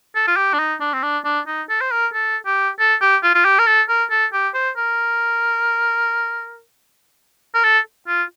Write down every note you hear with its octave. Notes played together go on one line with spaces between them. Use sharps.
A4
F4
G4
D4
D#4
D4
C4
D4
D4
D#4
A4
C5
A#4
A4
G4
A4
G4
F4
F4
G4
A#4
A4
A#4
A4
G4
C5
A#4
A#4
A4
F4